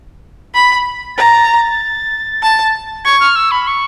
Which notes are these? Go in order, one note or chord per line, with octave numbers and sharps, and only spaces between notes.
B5
A#5 A6
A5
C#6 G#6
F6
E6
B5
C#6